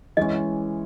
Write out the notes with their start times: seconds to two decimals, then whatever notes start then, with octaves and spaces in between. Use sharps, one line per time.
0.17 E3 G#3 C#4 D#5